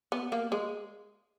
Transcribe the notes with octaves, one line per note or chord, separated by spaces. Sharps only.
B3
A#3
G#3